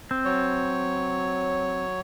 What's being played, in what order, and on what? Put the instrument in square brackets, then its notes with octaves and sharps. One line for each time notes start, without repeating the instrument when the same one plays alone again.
[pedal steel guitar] C4
[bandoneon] F#3 C#5